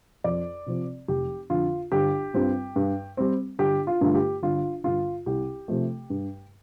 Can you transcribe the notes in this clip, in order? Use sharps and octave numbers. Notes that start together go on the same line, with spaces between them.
F2 D5
C3 F3 C4
F1 G4
F2 D3 F4
G1 G4
G2 G3 C4 F4
G2
G3 C4
G1 G4
F4
G2 D3 A3 F4
G4
G1 F4
G2 D3 F4
C2 G4
C3 F3 A3
G2